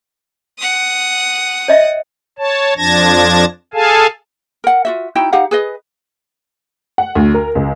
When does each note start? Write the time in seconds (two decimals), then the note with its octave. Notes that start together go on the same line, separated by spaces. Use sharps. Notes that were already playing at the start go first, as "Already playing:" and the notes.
0.59 F#5 D#6
1.68 C#5 D#5 E5
2.38 C#5 A5
2.77 F2 F3 D4 A5 G#6 A#6
3.74 G#4 A4 F5 G#5 A5
4.64 A#4 F#5
4.85 F4 F#4 E5
5.15 D#4 E4 F#4 G5
5.33 D#4 G4 F5 F#5
5.51 G#4 B4 D#5
6.98 F#5
7.15 D2
7.34 A#4
7.55 C#2